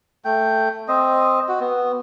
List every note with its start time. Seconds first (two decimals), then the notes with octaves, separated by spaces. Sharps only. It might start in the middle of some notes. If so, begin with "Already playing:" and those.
0.25 A3 G5
0.88 C4 D#5
1.48 F#4
1.61 B3